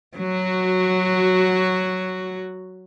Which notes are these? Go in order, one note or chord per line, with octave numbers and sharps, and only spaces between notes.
F#3 F#4